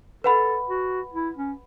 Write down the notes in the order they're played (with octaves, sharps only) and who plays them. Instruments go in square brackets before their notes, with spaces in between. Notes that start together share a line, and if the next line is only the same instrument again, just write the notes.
[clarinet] A4 [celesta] B4 F#5 B5
[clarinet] F#4
E4
C#4